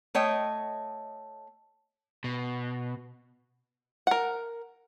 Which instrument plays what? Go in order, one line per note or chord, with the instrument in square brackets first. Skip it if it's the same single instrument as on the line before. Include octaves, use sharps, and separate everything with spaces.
[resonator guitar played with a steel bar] A3 C#5 D#5 G5
[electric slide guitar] B2
[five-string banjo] A#4 F#5